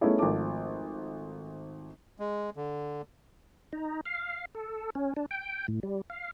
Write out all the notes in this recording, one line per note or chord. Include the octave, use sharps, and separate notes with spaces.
A3 B3 C#4 D#4 E4 G#4
G#1 F3 A3 A5 D6
G#3
D3
D#4
F5
A4
C#4
D4
G5
A2
G3
F5